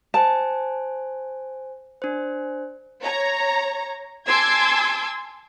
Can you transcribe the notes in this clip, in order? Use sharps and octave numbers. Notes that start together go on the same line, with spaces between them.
C5 G#5 A5
D4 C5
C#5 A#5
G#5 A5 C6 D6 E6 G#6